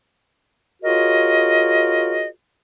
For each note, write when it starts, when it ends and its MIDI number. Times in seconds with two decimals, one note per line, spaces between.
0.83 2.28 65
0.83 2.28 66
0.83 2.28 68
0.83 2.28 70
0.83 2.28 73
0.83 2.28 75